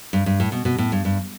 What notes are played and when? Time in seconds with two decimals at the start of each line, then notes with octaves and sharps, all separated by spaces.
0.13 G2
0.26 G2
0.40 A2
0.52 B2
0.65 B2
0.78 A2
0.92 G2
1.05 G2